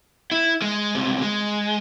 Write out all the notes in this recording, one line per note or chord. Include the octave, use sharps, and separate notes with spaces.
E4
G#3
C#2 C3
G#3